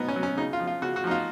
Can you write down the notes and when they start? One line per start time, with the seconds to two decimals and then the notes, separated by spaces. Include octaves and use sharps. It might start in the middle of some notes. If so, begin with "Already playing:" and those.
Already playing: B2 F#3 B3 D#4
0.08 C#4
0.16 F#3
0.23 C#4
0.37 C#3 D#4
0.53 F4
0.60 F3
0.67 F4
0.82 C#3 F#4
0.96 F#4
1.04 F3 D#4
1.11 F4